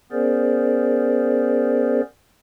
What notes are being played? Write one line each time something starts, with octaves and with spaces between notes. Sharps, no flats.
B3 C#4 G#4 A#4 C5 D5